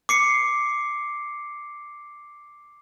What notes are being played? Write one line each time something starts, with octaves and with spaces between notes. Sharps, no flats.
D6 C7 C#7